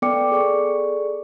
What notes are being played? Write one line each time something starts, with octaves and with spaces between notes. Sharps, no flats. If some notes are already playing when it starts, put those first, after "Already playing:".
B3 A4 D5 G5 D6 C#7
G#4 A4 D5 C#6